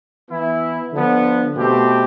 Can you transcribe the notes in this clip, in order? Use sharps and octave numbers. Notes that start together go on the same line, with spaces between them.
E3 B3 E4
D3 F3 B3
B2 A3 C4 G4